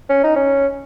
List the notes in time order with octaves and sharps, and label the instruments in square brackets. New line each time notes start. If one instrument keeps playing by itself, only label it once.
[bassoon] C#4
D#4
C#4